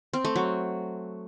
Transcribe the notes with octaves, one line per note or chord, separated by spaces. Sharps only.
C4
A3
F#3